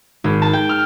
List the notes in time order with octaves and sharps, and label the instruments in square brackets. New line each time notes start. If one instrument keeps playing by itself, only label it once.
[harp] G#1
A5
G5
F6